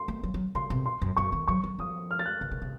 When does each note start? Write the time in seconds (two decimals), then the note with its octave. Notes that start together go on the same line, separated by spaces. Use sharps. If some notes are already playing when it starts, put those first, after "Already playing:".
Already playing: C6
0.08 A3
0.23 F#3
0.34 F#3
0.55 C#3 C6
0.70 C3
0.86 C6
1.02 F#2
1.17 F#2 C#6
1.32 D#3
1.48 F#3 C#6
1.64 F#3
1.79 F3 D#6
2.11 F6
2.19 A6
2.26 F#6
2.41 C#3
2.51 C#3
2.62 C3